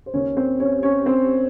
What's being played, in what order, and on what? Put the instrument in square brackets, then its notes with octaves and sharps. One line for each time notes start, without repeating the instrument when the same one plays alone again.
[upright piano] C5
D#2 D#3 C#4 C#5
C4 C5
C#4 C#5
C#4 C#5
C4 C5